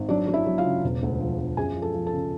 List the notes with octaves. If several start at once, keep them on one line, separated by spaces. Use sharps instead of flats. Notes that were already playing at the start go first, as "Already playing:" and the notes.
Already playing: G#1
F#3 D4 D5
F#3
E4 E5
F#3
F4 F5
C#3
E1
D2
F3
F3
F#2 G#4 G#5
F3
A4 A5
F3
A4 A5
C#3